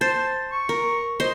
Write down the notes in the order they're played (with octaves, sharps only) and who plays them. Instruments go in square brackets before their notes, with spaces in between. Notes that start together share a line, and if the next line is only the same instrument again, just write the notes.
[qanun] C5 [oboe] A5
[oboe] C#6
[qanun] A#4
C5 D#5